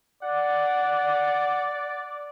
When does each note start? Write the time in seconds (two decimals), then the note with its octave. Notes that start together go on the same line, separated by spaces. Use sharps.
0.23 D5 F#5